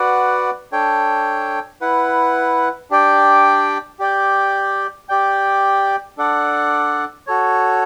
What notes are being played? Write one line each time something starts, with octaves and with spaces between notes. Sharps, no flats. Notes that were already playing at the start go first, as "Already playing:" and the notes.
Already playing: F#4 B4 D5 F#5
D4 A4 C#5 G5
E4 B4 F#5
D4 G4 D5 G5
G4 D5 G5
G4 D5 G5
D4 A4 D5 F#5
F#4 A4 C#5